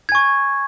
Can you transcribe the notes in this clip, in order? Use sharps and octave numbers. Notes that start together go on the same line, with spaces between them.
G#5 C#6 G#6